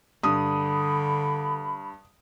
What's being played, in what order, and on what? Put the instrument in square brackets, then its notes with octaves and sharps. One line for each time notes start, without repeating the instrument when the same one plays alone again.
[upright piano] G2 [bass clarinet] D3 [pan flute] B5 [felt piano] D#6